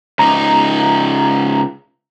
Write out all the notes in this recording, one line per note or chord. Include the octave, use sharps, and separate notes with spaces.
C#2 D#4 A#5